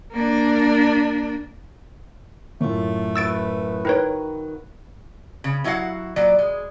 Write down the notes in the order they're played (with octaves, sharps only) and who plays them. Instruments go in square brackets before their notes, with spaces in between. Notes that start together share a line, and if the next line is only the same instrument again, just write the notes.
[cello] A#3 D4
[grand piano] F#2 A2 [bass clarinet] A3 [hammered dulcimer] F4 C#5
[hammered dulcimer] E4 F#4 B4 [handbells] E6 A6 D7
[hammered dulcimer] D#3 [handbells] E4 B4 C#5
[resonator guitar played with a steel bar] C#3
F#3 E4 F#4 D#5 F5 F#5
A#2 F#3 D5
G#3